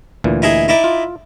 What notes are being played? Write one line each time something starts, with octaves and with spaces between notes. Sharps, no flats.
D2 A#2 E3
D#4 E4 G#4
D#4 E4 D5
F4